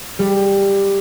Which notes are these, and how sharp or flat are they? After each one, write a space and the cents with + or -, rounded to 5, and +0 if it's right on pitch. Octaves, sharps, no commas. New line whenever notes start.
G3 +10